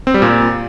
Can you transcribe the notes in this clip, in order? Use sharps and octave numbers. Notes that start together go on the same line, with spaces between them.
C4
G3
A#2